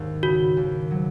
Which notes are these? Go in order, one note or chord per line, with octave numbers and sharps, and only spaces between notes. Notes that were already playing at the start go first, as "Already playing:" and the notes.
Already playing: D#2 G#2 D#4
C#3 F#4
D#2
F#3